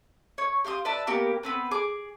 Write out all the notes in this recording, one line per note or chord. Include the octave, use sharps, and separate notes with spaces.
C#5
G4 F5 C6 D#6
B4 D5 E5 A5
A#3 B3 G4 A#4
B3 C4 B4
G#4 D6